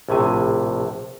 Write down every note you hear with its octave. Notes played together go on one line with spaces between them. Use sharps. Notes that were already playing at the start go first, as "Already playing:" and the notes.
A#1 A2 C3 G#5